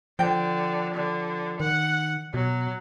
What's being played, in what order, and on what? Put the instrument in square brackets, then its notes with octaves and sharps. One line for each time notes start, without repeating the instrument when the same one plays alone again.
[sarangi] D3 [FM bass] F3 [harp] G5
[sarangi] D3
[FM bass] D#3 [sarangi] F#5
[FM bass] B2 [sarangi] F#3